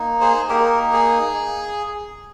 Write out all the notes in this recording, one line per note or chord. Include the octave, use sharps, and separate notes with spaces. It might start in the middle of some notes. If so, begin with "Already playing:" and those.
Already playing: A#3 D#4
G#4 C5
A#3 D#4 G4 A#4
G#4